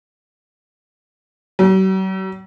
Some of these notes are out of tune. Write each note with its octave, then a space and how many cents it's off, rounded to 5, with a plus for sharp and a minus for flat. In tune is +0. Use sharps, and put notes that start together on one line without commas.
F#3 +45